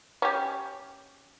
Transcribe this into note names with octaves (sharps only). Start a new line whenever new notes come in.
C#4 G4